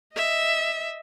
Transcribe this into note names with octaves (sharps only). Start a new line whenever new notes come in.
D#5 E5